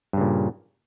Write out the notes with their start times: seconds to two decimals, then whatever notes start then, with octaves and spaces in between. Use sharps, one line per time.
0.13 G2
0.17 C#3
0.21 A#2